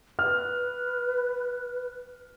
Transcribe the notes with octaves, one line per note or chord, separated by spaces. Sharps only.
B4 F6